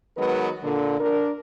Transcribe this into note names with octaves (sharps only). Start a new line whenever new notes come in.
D#3 F#3 G#3 B3 A#4 B4
A#2 D3
D4 A#4